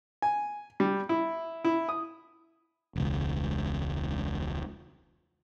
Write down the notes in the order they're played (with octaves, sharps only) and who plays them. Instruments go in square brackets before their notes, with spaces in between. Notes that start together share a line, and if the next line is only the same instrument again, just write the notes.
[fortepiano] G#5
G3
E4
E4
D#6
[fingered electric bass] E1 C#2